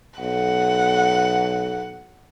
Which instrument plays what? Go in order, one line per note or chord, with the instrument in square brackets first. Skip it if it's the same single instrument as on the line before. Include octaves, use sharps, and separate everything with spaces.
[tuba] B1 [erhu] F#5